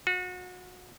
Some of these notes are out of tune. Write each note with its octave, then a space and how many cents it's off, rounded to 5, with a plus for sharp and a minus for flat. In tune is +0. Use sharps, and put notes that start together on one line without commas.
F#4 -30